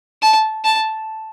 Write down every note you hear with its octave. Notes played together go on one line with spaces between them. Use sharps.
A5
A5